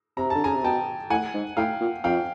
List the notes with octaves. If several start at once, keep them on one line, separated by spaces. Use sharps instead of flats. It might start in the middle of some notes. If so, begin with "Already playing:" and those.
C3 A#5
D3 A5
C#3 G#5 A#5
C3
B2 G5 A5
A2 F#5 G#5
G#2
A2 F5 G5
A#2
F2 F5 G5